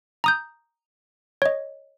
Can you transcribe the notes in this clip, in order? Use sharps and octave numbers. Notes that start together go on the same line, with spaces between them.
A#5 D#6 G6
C#5 D#5